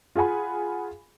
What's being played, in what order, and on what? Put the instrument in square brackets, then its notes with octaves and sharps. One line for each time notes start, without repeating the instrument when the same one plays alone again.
[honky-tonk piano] F4 G#4 F#5 G#5 B5